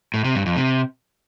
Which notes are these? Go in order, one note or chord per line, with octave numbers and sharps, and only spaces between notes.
A2
C3
G2
F2
C3